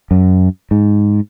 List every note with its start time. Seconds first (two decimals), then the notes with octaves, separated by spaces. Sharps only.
0.11 F#2
0.71 G#2